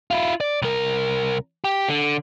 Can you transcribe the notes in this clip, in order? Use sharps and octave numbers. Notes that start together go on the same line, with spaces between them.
E4 F4
D5
C2 A#4
G4
D3